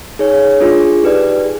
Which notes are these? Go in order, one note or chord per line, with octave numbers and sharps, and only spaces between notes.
D#4 G#4 C#5
D4 F4 G#4
D#4 G4 B4 D5
G#4